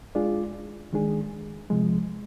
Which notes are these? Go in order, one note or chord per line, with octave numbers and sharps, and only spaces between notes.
G#3 D4 F4 G#4 D5
D#3 G#3 D4 G#4
C3 F3 G#3